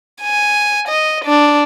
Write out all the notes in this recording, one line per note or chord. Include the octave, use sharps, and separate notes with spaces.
G#5
D#5
D4